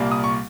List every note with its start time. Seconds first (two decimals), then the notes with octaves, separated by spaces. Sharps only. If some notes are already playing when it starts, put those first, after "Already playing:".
Already playing: C2 A#2 G3 A#3
0.12 D#6
0.24 C#6